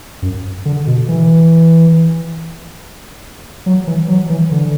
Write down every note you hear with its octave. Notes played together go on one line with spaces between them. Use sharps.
F#2
D3
B2
E3
F#3
E3
F#3
E3
D3